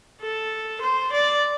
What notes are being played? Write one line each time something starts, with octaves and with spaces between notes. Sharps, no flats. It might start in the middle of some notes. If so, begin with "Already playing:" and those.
A4
C5
D5